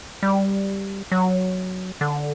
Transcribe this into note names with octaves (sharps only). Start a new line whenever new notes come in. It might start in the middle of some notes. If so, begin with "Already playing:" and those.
G3
F#3
D3